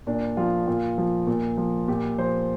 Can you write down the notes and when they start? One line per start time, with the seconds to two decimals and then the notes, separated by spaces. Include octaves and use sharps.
0.07 A#2 D4
0.37 F3 F4
0.67 A#2 F4
0.98 F3
1.27 A#2
1.57 F3
1.88 A#2 G4
2.18 F3 C5